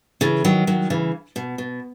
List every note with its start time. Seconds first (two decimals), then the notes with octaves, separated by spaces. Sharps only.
0.21 C#3 E3
0.44 D#3 F#3
0.67 D#3 F#3
0.90 C#3 E3
1.36 B2
1.58 B2